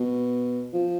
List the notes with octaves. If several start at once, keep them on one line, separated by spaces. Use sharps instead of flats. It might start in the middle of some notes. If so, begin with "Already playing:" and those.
Already playing: B2
F3